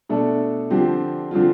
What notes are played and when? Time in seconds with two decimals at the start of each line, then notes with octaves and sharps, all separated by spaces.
0.09 B2 A3 D4 A4
0.71 D3 F3 C4 G4
1.31 D3 F3 C4 F4